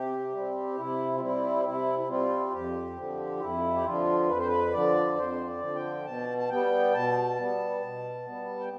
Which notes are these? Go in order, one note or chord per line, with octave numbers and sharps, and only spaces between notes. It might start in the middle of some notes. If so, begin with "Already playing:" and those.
Already playing: C3 G4
G3 C4
C3 E4
F4
G3 C4 E4
C3 E4
E4
G3 C4 F4
F4
F2 G4
D3 F3
F4
F2 E4
G4
D3 F3 F4
F2 B4
C5
B4
D3 F3 D5
F2 C5
D5
D3 F3
G5
B2 A5
A5
G3 B3 G5
B2 A5
G3 B3
B2
G3 B3
G5